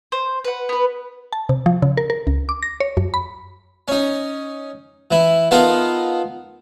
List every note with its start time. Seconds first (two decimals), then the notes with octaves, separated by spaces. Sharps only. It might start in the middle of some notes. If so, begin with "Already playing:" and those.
0.12 C5
0.44 B4 F#5
0.69 B3 B4
1.33 A5
1.49 C3
1.66 F3
1.82 C#3
1.97 A#4
2.10 A#4
2.27 C#2
2.49 D6
2.63 A#6
2.80 C#5
2.97 F#2
3.14 B5
3.88 C#4 D#4
5.11 E3 E4
5.51 B3 D#4 F4 A4 A#4